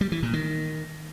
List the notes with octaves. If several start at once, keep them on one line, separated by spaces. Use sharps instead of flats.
G3
E3
A#2
D#3